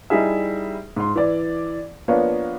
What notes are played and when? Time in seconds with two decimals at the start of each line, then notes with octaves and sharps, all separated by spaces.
0.10 G3 D#4 E4 G#4 E5
0.96 G#2 C6
1.16 E3 D5
2.08 F3 A#3 B3 D4 C#5